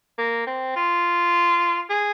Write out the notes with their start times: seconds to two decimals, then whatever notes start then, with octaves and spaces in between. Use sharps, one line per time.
0.18 A#3
0.47 C4
0.76 F4
1.90 G#4